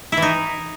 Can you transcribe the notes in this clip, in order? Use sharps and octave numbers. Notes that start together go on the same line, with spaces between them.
E4
E3
D#4